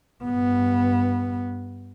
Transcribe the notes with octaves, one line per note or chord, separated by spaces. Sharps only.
G2 B3